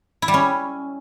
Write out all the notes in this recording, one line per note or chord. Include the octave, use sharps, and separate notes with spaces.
E4
G3
C#4